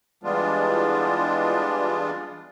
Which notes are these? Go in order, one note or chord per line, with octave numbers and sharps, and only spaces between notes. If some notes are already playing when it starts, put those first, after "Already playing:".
E3 G3 G#3 B3 D4 F4